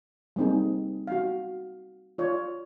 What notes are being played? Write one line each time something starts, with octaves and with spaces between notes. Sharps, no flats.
G3 A#3 C4 D#4 G#4
F#4 F5
F4 C#5 D5